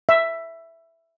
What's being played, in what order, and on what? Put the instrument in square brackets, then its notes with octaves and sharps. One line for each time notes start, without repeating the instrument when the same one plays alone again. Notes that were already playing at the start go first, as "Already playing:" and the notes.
[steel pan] E5